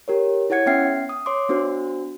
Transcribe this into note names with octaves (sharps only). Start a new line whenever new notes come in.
G4 A#4 C#5
E4 G#4 C#5 F#5 G#6 C#7
B3 C#4 E5 G5 F6 C7
D#6
C#5 C6 D6
B3 D4 F#4 C5